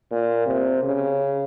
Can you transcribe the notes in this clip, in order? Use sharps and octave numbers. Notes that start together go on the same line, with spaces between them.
A#2
C3
C#3